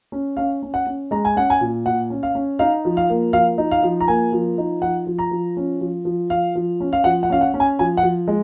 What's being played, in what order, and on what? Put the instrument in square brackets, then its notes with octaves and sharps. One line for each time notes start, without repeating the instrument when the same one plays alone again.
[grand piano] C#4
C#4 F5
C#4
F#5
C#4
G#3 A#5
G#5
C#4 F#5
G#5
A#2
A#2 F#5
C#4
F5
C#4
D#4 F5
F3
F5
A#3
F3 F5
D#4
F5
F3
A#5
A#3 G#5
F3
D#4
F3 F#5
F3
A#5
F3
C#4
F3
F3
F3 F5
F3
C#4
F5
F3 F#5
F#5
C#4 F5
F#5
C#4
G#5
F3 G#5
F#5
F3
G#3